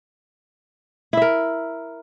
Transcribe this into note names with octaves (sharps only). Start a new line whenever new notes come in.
E4 A#4 E5